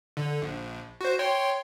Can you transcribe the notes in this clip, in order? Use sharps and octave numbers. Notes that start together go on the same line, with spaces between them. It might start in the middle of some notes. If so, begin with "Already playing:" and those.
D3
A#1
F#4 C5
C#5 G5 C6